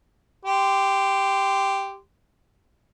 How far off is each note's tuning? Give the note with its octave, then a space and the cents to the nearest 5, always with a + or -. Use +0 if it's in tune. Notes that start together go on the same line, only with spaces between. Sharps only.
G4 +0 C6 -15